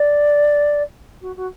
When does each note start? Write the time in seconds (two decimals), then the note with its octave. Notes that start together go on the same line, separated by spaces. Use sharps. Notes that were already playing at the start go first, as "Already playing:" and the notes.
Already playing: D5
1.21 F#4
1.36 F#4